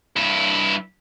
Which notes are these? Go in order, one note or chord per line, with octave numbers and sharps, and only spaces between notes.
G2 E4